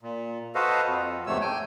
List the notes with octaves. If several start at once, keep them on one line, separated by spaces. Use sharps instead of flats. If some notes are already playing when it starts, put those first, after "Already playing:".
A#2
F#4 A4 B4 C5 D#5 F5
F2
E2 G#2 C3 A3 C#5 E6
G5 G#5